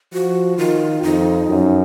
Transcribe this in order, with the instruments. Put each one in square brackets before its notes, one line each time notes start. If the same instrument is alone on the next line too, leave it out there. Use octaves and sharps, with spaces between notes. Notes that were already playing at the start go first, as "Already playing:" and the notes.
[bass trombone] F3 [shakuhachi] F#4
[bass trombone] D#3 [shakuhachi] F4
[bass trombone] F2 [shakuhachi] D#4
[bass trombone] F#2